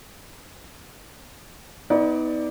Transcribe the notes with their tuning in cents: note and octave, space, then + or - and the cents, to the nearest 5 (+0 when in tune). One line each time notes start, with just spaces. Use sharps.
B3 +15 D#4 +35 D5 +0